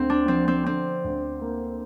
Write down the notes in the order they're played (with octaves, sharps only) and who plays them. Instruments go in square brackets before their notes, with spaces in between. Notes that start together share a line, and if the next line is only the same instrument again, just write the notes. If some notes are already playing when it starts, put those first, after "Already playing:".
Already playing: [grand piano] D2 [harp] C4
[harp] D4
[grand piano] F3 [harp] C4
[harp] C4
[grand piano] D3 [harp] C4
[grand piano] D2
A#3